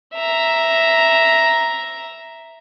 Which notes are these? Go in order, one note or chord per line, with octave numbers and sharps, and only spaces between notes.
E5 A#5